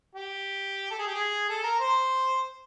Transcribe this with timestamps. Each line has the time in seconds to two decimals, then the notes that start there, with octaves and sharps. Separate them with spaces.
0.15 G4
0.91 A4
0.99 G#4
1.07 G4
1.14 G#4
1.49 A4
1.64 A#4
1.80 C5